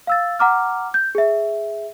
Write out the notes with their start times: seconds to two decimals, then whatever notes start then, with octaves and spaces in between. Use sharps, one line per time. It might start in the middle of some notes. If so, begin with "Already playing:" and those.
0.07 F5 E6 A6
0.39 F#5 A#5 D6 F6
0.94 G6
1.15 G#4 E5